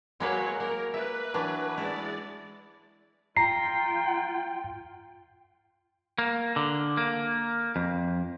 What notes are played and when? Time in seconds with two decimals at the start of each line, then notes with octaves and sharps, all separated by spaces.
0.20 F#3 G#3 A#3 B4 C#5
0.60 A#3 A#4
0.94 B4 E5
1.34 E3 F#3 D4
1.78 G#3 E4 D5
3.37 F4 G5 A#5 C7
6.18 A#3
6.56 D3
6.97 A#3
7.76 F2